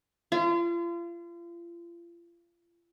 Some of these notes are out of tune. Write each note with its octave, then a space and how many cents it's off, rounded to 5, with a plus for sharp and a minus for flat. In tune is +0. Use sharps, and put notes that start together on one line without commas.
F4 -35